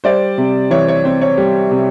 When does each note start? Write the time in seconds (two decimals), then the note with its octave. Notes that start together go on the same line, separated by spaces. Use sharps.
0.04 G3 C5 D5
0.38 C3
0.70 E3 C#5
0.88 C#5
1.04 C4 C5
1.21 C#5
1.38 G3
1.71 C3